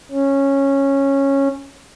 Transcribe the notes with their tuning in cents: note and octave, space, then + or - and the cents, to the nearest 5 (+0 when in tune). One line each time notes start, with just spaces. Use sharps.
C#4 -10